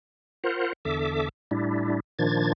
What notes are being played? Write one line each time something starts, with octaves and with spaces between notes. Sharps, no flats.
F4 A#4 C5 F#5
E2 D3 A4 E5 D6
A2 G3 D4 E4
A#2 D#3 F3 D4 G#6 A6